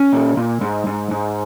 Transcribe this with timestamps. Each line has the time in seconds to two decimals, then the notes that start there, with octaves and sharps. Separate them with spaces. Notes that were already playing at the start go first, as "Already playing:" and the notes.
Already playing: C#4
0.13 A#2
0.37 A#2
0.61 G#2
0.87 G#2
1.11 G#2